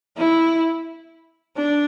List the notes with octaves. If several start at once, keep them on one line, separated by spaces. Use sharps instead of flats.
E4
D4